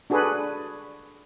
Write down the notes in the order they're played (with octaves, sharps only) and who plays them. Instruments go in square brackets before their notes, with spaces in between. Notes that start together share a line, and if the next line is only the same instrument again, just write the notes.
[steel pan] D4 F#4 G#4 A4 B4